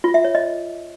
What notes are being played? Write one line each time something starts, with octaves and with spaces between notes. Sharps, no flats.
F4
E5
C#5
D#5